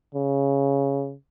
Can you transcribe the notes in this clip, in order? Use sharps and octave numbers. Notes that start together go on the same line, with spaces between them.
C#3